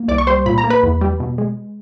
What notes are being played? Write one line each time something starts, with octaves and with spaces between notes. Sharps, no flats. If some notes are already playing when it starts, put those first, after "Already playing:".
Already playing: A#3
C2 D5 D6
C#6
G3 C5 C6
A#2 B5
A#5
A#3
B4 B5
E2
G3
B2
G#3